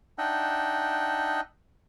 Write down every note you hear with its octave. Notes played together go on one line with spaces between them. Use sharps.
D4 D#4 D#5 E5 F#5 G5